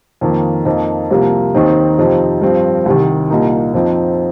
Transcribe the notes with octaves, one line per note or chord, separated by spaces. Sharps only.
F2 D#3 A#3
F2 F3 A#3 D#4
C2 C3 F3 A#3
D#2 D#3 C4 D#4
F2 C3 F3 C4 D#4
G2 F3 C4
C2 C3 D#3
C2 A#2 A#3 D#4
F2 F3 C4 D#4